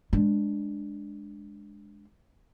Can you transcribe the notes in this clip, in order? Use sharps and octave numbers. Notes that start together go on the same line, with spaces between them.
G#3 D4